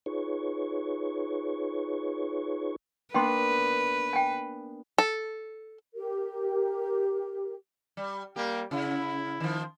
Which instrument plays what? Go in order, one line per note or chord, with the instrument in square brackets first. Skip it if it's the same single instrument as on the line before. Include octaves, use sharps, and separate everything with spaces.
[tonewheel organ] D#4 F4 G#4 B4 C#5 C#6
[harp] A#3 B3 D4 [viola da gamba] B4 [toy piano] G5 C6
[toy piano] G5 G#5
[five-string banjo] A4
[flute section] G4 A#4
[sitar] G3
[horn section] G3 A#3 [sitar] G4
[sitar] C#3 [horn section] E4
[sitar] D#3 F3